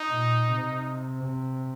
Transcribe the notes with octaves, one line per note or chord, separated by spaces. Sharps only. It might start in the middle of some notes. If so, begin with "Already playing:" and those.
Already playing: D#4
A#2
C3